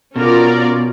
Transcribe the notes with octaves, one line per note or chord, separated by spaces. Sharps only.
B2 C#4 F4 A#4 D5